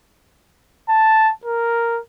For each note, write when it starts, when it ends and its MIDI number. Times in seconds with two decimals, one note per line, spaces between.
0.89 1.32 81
1.45 2.00 70